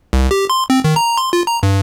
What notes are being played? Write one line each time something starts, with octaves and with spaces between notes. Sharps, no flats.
C2
G4
C6
C4
D#3
A#5
C6
F4
A#5
G2